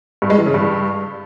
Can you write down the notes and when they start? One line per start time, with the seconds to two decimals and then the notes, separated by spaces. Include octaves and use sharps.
0.22 G2
0.30 G#3
0.38 E3
0.46 C#3
0.54 G2